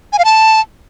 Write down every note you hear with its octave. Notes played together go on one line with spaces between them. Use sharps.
G#5
F5
A5